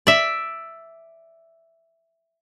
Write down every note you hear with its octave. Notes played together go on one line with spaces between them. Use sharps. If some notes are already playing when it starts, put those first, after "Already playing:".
D5 E5